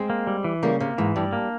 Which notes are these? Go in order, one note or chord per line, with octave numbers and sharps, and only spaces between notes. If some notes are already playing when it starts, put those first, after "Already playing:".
Already playing: G#3 C4
A#3
G3
E3
C#3 G3 A#3
C3 A#3
G#2 E3
G2 G3
A#3